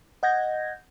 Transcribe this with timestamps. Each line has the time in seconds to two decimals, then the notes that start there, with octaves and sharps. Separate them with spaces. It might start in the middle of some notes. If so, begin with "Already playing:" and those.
0.23 D#5 F#5 G6 G#6 A#6